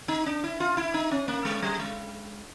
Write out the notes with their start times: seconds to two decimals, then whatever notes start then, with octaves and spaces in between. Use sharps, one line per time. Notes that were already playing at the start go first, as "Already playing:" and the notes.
0.08 D#4
0.26 D4
0.44 E4
0.60 F4
0.77 E4
0.94 D#4
1.11 C#4
1.28 A#3
1.45 G#3
1.62 G3
1.79 G#3